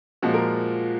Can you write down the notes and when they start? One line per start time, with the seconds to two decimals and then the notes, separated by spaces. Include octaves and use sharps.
0.22 A#2 F3 G#3 F#4
0.34 A#4